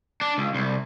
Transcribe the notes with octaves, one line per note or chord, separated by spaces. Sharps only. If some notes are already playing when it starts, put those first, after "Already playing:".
D4
C#2
C2